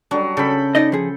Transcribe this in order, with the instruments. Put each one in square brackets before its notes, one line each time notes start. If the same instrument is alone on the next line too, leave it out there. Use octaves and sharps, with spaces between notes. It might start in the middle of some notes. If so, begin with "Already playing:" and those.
[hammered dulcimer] F#3 G3 [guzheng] D4
[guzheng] C#3 [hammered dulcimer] A4 G5 B5
[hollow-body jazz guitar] D#4 D5 D#5
F3 G#4